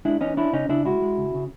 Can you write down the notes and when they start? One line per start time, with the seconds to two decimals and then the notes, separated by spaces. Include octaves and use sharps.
0.05 G#3 D4 E4
0.21 E3 C#4 D#4
0.37 C#4 D4 E4
0.53 C#3 C#4 D#4
0.69 C#3 D4 E4
0.85 G#3 E4 F#4
1.02 G#3
1.18 C#3
1.34 C#3